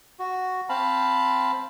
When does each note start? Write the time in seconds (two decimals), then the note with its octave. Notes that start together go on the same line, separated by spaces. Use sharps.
0.19 F#4
0.69 C4 F5 A5 B5